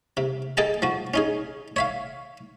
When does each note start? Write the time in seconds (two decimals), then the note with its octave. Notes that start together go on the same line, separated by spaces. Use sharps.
0.17 C3
0.57 G#4 A4 D#5 G5 A5 A#5
0.82 F3 F#4
1.14 C#4 D#4 G#4
1.76 C#5 E5 F5